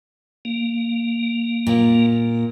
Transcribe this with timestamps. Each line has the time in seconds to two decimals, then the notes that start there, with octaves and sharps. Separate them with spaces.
0.45 A#3
1.67 A#2